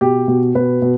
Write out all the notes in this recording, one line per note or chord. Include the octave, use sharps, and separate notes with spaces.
B2 G4
B2
B2 B4
B2